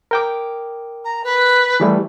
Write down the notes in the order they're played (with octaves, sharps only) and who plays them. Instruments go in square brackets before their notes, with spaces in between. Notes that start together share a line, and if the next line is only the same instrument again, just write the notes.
[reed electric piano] A#4 G5 D6
[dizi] A#5
B4
[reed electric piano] E3 G3 A3